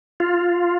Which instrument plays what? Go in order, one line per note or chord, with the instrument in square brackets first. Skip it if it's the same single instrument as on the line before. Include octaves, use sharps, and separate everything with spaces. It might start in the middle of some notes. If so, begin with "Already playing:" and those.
[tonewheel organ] F4